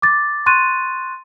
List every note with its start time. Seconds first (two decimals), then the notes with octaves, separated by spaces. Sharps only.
0.02 D6 A6
0.46 C6 C#6 F#6 A6 D#7